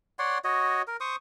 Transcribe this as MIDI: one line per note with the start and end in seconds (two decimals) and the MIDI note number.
0.19 0.38 73
0.19 0.38 74
0.19 0.38 78
0.19 0.38 84
0.44 0.82 66
0.44 0.82 73
0.44 0.82 75
0.87 0.97 70
1.01 1.16 72
1.01 1.16 85
1.01 1.16 87